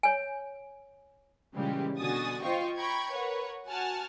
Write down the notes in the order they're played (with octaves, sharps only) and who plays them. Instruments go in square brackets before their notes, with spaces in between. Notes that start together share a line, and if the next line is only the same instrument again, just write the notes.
[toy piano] C#5 G#5
[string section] A#2 C#3 E3 G3 G#3 G4
B2 D3 F#4 G#5 D#6 A6
F4 C5 D#5 F5 G5 C#6
G5 A#5 B5 C#6 G#6
A#4 B4 C#5 F#5
F#4 F#5 G#5 A5 F6